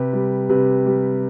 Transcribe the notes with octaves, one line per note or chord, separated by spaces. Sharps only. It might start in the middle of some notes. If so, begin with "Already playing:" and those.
Already playing: C3 G4 B4
G3
C3 G4 B4
G3